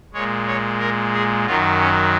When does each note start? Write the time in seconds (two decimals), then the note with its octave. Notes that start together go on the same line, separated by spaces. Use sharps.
0.13 A#2 G#3 C#5
0.47 C#5
0.80 A#4
1.13 G#4
1.46 F#2 D#3 F#3 F4
1.79 C#4